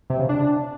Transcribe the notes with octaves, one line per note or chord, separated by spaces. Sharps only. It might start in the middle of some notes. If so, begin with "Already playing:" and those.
C3
C#3
D4